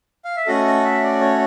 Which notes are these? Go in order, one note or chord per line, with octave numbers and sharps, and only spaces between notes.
F5
E5
A3 C#4 F#4 A4 D#5
D#5
E5
D5
C#5